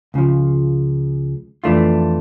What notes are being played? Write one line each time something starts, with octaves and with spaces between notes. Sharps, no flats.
C#2 C#3 F3
F2 E3 A3 D4 F4